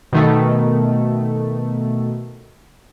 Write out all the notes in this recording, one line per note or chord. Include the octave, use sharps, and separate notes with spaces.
B2 D#3 A3